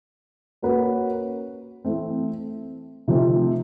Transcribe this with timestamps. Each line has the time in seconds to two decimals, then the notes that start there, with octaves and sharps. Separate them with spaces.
0.62 A#3 C#4 F#4 B4
1.85 E3 A3 C4
3.08 C3 F3 A3 C4 D#4